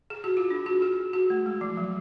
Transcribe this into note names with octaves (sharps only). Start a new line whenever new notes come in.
G#4
F#4
F4
D4
F#4
G#4
F#4
A3
G#3
F3
F#3